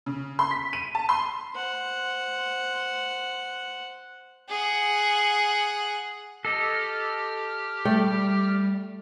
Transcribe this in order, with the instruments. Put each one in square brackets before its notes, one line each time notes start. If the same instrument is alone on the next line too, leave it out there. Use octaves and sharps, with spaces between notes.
[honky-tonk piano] C#3
C6
B6
D#7
A5
C6
[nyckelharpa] C5 F#5
[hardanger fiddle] G#4 F#5
[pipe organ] G4 F6 [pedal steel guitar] A4 D#5
[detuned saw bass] G3 [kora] A3 D5 G5